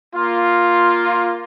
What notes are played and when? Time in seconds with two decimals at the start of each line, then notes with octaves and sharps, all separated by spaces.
0.14 A#3 F4